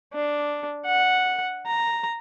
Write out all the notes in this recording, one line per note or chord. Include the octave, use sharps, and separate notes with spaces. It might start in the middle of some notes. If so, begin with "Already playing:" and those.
D4
F#5
A#5